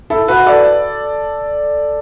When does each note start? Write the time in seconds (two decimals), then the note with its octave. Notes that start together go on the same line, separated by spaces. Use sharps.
0.10 E4 A4
0.28 F#4 B4
0.46 A4 D5